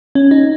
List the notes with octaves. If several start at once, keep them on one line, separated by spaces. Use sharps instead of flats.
C#4
D#4